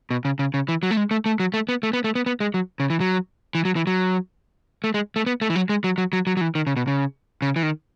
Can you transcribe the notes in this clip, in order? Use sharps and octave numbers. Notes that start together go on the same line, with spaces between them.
B2
C#3
C#3
C#3
E3
F#3
A3
G#3
A3
A3
F#3
A3
B3
A3
B3
A3
B3
B3
G#3
F#3
C#3
E3
F#3
E3
F#3
E3
F#3
A3
G#3
A3
B3
A3
E3
F#3
G#3
F#3
F#3
F#3
F#3
F#3
E3
D#3
C#3
B2
C#3
C#3
E3
D#3